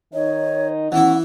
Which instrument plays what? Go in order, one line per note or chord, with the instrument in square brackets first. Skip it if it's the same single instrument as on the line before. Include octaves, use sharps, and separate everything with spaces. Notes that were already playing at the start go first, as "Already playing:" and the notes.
[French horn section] D#3 D#4 D#5 [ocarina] C#5
[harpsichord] E3 E4 [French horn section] B3 C#4 F#4 [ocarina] F#5